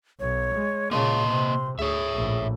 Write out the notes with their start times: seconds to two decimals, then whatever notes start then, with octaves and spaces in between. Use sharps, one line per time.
0.20 B1 C#5
0.55 G#3
0.91 A#2 C#3 A#3 D#5 A5 C6
1.28 C3
1.79 D2 G#4 C#5 E5
2.14 A#1 A2